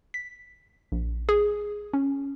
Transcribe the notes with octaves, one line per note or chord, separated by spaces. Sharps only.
B6
A#1
G#4
C#4